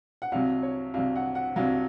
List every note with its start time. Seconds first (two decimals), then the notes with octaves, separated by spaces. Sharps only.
0.22 F#5
0.32 C2 C3 F#3 F5
0.63 C#5
0.94 C2 C3 F#3 F5
1.16 F#5
1.35 F#5
1.56 C2 C3 F#3 F5